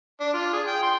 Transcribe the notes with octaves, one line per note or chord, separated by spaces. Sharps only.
D4
F4
G#4
G5
C6